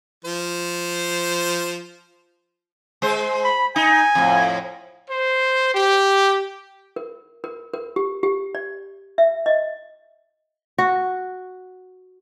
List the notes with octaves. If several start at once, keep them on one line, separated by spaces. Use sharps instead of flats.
F3 C5
G#3 C5
B5
D#4 G#5
F2 A2
C5
G4
A#4
A#4
A#4
G4
G4
D5
E5
D#5
F#4